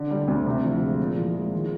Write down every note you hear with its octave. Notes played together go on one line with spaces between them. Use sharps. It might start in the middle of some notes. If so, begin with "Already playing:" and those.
Already playing: D3
G3
D2
C3
F3
G#3
A#2
F3
G#3
D#3